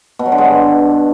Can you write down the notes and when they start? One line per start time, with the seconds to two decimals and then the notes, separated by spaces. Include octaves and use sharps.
0.19 B2
0.26 F#3
0.32 D3
0.38 G#3
0.44 G2